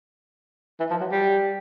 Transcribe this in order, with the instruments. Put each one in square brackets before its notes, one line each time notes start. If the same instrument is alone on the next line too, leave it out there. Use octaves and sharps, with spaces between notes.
[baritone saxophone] E3
F3
F#3
G3